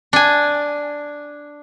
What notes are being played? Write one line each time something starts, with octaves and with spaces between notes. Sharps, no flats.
D4 G#5